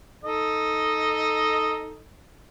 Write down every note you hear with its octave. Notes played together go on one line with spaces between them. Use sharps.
D#4 A4 D#5